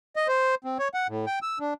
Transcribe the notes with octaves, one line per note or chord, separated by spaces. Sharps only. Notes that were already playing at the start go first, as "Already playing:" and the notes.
D#5
C5
C4
C#5
F#5
A2
G5
E6
D4